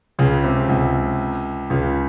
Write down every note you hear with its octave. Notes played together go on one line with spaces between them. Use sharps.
C#2 C#3
C3
C#2 C#3
C#2 C#3